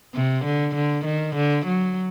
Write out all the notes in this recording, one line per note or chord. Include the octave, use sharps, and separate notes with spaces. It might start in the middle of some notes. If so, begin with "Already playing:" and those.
C3
D3
D3
D#3
D3
F#3